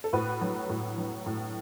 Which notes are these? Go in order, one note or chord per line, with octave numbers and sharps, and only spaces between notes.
A4
A2 F#4 B4
F#3
A2
F#3
A2